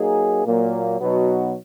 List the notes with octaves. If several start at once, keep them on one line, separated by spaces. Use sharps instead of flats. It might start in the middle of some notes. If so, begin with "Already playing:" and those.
Already playing: F#3 A#3 D#4 G#4
A#2 F#3 A#3
B2 F#3 B3 D#4 F#4